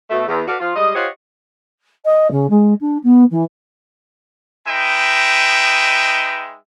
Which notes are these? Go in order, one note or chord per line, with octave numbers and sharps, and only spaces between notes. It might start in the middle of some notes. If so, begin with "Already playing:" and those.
B2 A3
E2
F#4 A4 B4 D5 F5
F3 F4
G3 G#3 D#5
F4 G4 C5 C#5 D#5 F#5
D#5
C#3
G#3
D4
B3
E3
G#3 D#4 B4 E5 G5